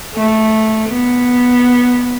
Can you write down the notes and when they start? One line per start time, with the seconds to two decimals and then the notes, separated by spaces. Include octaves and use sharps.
0.14 A3
0.89 B3